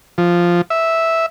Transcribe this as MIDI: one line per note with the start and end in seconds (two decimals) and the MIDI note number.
0.18 0.61 53
0.70 1.26 76